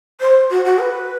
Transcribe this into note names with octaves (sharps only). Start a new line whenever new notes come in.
C5
F#4
F#4
B4